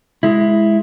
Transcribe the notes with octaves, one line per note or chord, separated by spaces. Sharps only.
G#3 E4